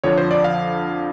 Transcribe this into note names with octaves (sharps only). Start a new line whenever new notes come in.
F2 D3 F3 C#5
C5
D5
F5